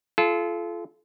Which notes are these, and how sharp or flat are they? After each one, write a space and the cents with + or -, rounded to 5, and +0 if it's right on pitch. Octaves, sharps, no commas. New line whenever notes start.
F4 -25 A4 -35